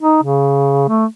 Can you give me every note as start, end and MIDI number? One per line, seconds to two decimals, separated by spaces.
0.02 0.19 63
0.23 0.84 49
0.88 1.05 57